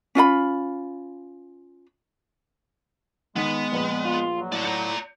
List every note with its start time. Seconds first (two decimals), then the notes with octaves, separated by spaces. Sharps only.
0.15 C#4 F4 D#5 B5
3.36 D#3 G#3 B3 B6
3.72 A#1 B4 F#7
4.05 F4
4.36 F#3
4.52 A2 D5 F#5
4.65 D5 A#5 G6 C#7